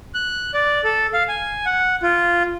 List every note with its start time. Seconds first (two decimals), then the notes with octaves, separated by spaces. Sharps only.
0.14 F#6
0.54 D5
0.84 A4
1.14 F5
1.29 G#5
1.66 F#5
2.03 F4